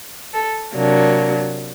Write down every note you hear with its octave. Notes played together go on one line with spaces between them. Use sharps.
A4
C3 F#3 A#3 D4